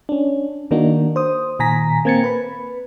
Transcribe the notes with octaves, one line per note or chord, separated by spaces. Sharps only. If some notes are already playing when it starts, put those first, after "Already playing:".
C#4 D4
D#3 A#3 D4 D#4 F#4
C5 D#6
A#2 D#3 G#5 A#5 A#6 B6
A#3 C4 G#6 A6 C#7
B4 B5